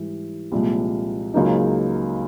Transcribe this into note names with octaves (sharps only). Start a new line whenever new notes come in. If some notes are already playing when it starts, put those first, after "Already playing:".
Already playing: G#2 E3 G3
C2 A#2 F3 G#3
C#2 C#3 F#3 A#3 D#4